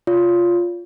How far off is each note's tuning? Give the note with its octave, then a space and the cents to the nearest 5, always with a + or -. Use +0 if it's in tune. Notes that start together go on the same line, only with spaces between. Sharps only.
F4 +0 C#5 +40